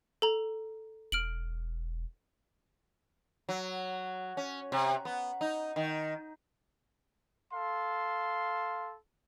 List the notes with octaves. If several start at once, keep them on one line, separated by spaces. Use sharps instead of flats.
A4 A#5
E1 F6 D7 F#7
F#3
C#4
C3
B3
D#4
D#3
A4 F5 C6